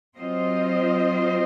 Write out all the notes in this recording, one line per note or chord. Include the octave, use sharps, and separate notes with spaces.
F#3 C4 F4 C5 D#5